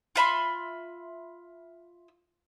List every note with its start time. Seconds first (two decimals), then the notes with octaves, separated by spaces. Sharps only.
0.16 F4 E5 B5 C6